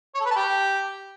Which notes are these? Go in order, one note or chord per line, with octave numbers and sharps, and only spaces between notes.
C#5
A4
B4
A5
G4